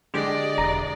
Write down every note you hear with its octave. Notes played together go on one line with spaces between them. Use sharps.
D3 G#3 G4 D5 D#5
E1 A#5